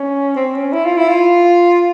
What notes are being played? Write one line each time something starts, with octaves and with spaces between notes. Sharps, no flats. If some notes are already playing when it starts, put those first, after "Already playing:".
Already playing: C#4
C4
C#4
E4
F4
E4
F4